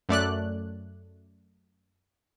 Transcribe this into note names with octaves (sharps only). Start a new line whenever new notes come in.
F#2 A3 D5 F#6